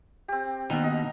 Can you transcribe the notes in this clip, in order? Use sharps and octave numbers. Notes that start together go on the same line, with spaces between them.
C4 G4
D#2 B2 D#4 F#5
D#5